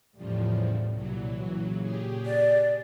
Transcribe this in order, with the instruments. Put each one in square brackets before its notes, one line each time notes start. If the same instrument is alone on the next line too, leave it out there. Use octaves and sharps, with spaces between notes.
[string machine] E2 C#3 F3 [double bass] A2 G3
[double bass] C2 A#2 [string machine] E3 F#3
[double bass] A#2 C#3
[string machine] G4 G#4
[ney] D5